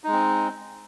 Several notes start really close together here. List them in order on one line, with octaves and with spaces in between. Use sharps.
D#4 G#3 C4